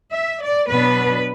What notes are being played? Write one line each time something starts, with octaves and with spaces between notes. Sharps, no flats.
E5
D5
B2 F#3 B3 D4 B4